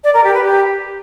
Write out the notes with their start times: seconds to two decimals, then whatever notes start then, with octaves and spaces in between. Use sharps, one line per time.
0.04 D5
0.14 A#4
0.24 G4
0.34 B4
0.44 G4